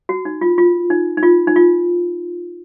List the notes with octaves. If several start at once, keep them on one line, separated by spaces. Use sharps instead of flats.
F#4
D#4
F4
F4
D#4
D#4
F4
D#4
F4